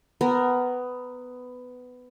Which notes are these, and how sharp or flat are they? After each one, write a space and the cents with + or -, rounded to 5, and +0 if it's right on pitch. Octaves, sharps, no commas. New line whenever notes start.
B3 +15 A#4 +0